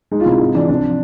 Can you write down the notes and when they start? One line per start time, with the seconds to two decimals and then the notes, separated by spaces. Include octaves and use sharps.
0.11 G#3 D#4
0.20 F4
0.26 C3 E4
0.40 G#2 D#4
0.55 E3 D4
0.69 C3 D4
0.83 F3